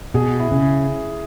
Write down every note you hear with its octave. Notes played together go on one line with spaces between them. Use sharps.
B2 G#4
E4
C#3